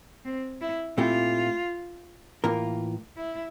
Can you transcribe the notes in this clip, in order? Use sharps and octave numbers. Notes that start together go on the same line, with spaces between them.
C4
E4
A#2 A3 C4 E4 F4 G4
A2 E3 A#3 F4 A#4
E4